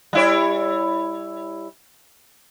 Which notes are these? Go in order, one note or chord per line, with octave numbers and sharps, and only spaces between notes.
G3 E4 C#5